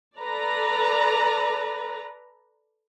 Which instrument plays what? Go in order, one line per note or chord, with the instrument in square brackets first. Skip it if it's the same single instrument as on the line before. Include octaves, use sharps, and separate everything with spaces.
[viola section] A4 B4 D5 A#5